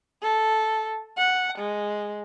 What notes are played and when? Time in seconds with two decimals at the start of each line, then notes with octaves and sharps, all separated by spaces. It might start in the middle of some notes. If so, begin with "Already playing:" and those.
0.22 A4
1.17 F#5
1.58 G#3